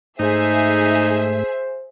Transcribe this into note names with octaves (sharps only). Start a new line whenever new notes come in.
G#2 A3 D#4 G#4 C5 E5